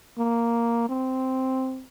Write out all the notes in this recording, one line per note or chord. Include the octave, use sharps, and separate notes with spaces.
A#3
C4